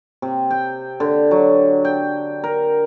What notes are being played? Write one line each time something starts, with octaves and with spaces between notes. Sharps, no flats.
C3
G5
D3
F#3
G5
A#4